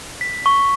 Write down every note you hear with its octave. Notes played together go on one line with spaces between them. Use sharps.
B6
C#6